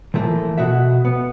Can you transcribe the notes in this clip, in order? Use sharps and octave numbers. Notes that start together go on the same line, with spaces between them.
E3 F3 A3 A#3
B2 F#4 E5
B3